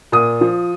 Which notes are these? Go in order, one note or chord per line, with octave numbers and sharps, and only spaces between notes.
A#2 D#6
F3